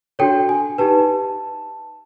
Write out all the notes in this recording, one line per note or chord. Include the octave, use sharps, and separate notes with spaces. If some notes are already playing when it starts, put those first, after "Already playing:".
D4 F#4 A4 C#5 G5
G#5
D#4 G4 B4 A5